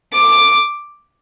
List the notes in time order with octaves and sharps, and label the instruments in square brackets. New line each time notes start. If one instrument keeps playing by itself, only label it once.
[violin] D6